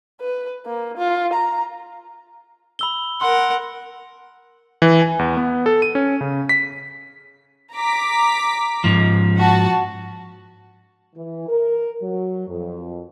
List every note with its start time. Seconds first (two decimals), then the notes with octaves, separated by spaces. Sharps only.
0.21 B4
0.66 A#3
0.98 F4
1.33 A#5
2.79 B5 E6 G7
3.21 A#4 F#5 C6
4.82 E3
5.02 G#5
5.19 E2
5.37 B3
5.66 A4
5.82 D#7
5.95 C#4
6.21 C#3
6.49 B6
7.74 A#5 D6 B6
8.84 G#2 F3
9.38 F#4 A5
11.15 E3
11.48 A#4
12.01 F#3
12.48 F2